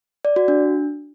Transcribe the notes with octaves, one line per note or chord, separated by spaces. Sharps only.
D5
F#4
D4